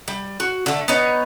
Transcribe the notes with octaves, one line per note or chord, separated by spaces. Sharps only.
G3
F#4
D3 A3
B3 D#4 C#5